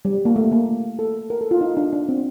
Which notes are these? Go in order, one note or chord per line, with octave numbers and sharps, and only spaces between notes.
G3
A#3
A3
A#3
A4
A#4
A4
F4
D#4
D4
D4
C4